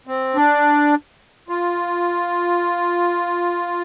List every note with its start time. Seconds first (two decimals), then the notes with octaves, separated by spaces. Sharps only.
0.07 C4
0.35 D4
1.49 F4